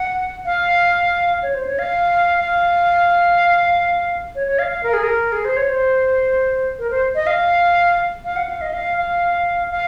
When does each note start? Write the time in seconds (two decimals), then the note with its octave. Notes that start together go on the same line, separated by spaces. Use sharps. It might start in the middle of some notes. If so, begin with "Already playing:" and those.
Already playing: F#5
0.45 F5
1.43 C#5
1.54 C5
1.67 C#5
1.79 F5
2.39 F5
4.35 C#5
4.47 C#5
4.59 F5
4.71 F5
4.83 A#4
4.93 G#4
5.04 A#4
5.32 G#4
5.45 C5
5.57 C#5
5.69 C5
6.79 A#4
6.91 C5
7.15 D#5
7.27 F5
8.24 F5
8.36 F#5
8.49 F5
8.61 D#5
8.73 F5
8.98 F5
9.71 F5